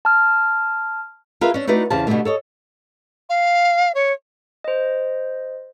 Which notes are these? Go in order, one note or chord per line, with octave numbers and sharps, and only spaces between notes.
A5 F6
F4 G#4 A#4 B4 E5 F5
C#4 D4
A3 D#4 F#4 B4 D5
E2 C#3 C5 F5 A5
B2 D3 E3 G3 A3 A#3
A4 C#5 D#5
F5
C#5
C5 D#5